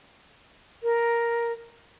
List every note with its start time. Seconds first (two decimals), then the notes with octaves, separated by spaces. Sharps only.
0.83 A#4